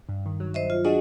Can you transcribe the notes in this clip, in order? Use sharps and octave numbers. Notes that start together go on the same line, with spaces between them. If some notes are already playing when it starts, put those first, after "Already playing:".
G2
D#3
F#3
C5 D#5 E5
F4
D4 F#4 G#4 D#5